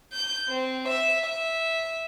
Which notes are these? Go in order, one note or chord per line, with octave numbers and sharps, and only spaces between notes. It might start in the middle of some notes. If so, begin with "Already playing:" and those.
G6
C4
E5
E5